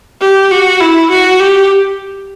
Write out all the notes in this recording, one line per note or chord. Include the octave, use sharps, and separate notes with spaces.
G4
F#4
E4
F#4
G4